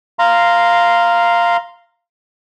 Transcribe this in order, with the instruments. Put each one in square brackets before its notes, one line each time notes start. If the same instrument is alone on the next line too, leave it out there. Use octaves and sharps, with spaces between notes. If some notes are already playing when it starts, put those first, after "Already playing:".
[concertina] F5 A#5 C6